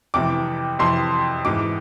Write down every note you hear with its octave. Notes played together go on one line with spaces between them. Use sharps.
F2 C3 E3 D6
F2 C3 E3 C6
G#2 E3 D6